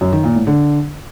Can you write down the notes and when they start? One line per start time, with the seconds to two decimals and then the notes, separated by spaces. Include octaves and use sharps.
0.01 F#2
0.13 D#3
0.24 A#2
0.35 A2
0.47 D3